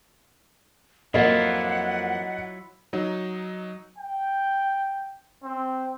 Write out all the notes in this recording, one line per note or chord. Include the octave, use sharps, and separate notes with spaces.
F2 F#3 A#3 E4 F4 D#5 F#5
F#3 D#4
G5
C4